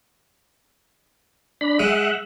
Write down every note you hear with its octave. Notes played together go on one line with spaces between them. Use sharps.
D4 B5
G#3 E5 F#5